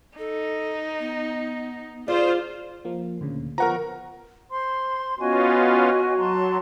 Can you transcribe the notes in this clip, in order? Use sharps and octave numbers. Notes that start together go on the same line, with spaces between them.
D#4 A4
B3
D3 F4 G#4 C5 D5
F3 A#3
D2 A#2 C#3
F3 B3 A#4 F#5 A#5 C#6
C5 C6
B3 C#4 F4 F#4 C#5 D#5 G#5
F#3 A5 A#5 C6